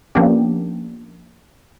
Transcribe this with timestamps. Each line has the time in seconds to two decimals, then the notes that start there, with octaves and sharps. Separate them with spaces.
0.15 F3 A#3 B3 C#4 D4 G4